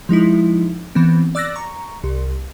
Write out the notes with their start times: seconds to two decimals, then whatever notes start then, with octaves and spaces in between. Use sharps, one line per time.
0.09 F3 G#3 D#4 E4
0.95 E3 B3 C4
1.35 D5 D6 E6 F#6 A6 A#6
1.56 A#5 C#6
2.04 C2